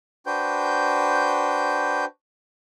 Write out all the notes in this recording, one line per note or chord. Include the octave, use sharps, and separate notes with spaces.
D4 F#4 B4 C5 G5 G6